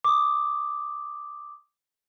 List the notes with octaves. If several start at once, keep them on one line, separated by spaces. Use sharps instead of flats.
D6 D#6